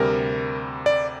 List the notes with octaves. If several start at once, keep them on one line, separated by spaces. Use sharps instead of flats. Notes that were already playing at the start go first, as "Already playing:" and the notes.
Already playing: D2 C3 G3 A#4
D5